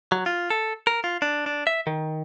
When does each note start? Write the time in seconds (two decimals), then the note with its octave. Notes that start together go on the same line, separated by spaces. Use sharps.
0.12 F#3
0.26 F4
0.50 A4
0.87 A#4
1.04 F4
1.22 D4
1.46 D4
1.67 E5
1.87 D#3